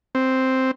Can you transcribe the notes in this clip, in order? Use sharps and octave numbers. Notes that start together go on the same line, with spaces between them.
C4